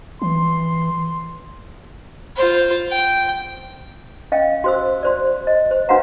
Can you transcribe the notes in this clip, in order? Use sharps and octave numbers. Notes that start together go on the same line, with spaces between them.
E3 C6
F4 C5
G5
C#4 D#5 F5 G5
F#4 C5 E6
F#4 C5 D5
D#5
C5
D4 F#4 B4 F5 F#5 A#5